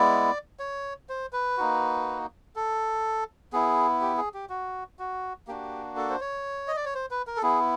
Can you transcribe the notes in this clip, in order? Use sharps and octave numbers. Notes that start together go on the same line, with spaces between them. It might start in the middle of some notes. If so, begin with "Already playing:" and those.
Already playing: G#3 B3 E4 D5
C#5
C5
B4
A#3 D#4 F#4
A4
B3 E4 G#4
G4
G#4
G4
F#4
F#4
A#3 D4 F#4 G4
A4
C5
C#5
D#5
D5
C#5
C5
B4
A#4
A4
B3 E4 G#4